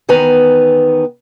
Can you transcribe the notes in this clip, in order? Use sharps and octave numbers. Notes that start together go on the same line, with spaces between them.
E2 D#3 B3 B4 G#5 A#5